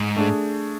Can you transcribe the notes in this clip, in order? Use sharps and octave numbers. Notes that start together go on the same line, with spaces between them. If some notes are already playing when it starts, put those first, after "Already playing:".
Already playing: G#2
A3 D4 G#4